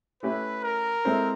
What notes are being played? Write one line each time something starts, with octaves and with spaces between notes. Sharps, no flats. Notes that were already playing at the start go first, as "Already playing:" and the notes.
A3 C#4 E4 G4 B4
A#4
G#3 C4 E4 A4 C5